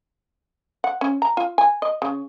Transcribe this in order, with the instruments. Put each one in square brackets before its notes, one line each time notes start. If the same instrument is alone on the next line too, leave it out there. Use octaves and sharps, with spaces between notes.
[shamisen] F#5
C#4
A#5
F4
G#5
D#5
C#3